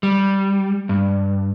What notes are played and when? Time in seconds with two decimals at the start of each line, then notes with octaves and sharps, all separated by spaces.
0.03 G3
0.89 G2